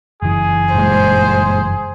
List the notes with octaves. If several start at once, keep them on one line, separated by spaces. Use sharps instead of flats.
F#1 E3 G#4
G2 A#2 G#3 C5